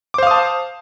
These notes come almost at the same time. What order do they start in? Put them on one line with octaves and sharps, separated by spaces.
D6 C5 F5 D#6 A5